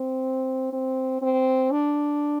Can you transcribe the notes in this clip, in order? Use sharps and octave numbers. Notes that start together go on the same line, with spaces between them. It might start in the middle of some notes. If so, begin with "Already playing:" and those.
Already playing: C4
C4
C4
D4